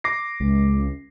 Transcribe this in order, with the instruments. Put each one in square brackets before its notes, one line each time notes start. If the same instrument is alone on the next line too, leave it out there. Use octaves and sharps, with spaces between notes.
[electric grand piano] D6 A#6 C7
[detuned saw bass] C#2